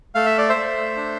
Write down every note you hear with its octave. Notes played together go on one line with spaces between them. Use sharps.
A3 F5
E5
D5
C5 E5
A3
D4